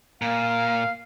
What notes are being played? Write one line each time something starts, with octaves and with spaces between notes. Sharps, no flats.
A#2 F5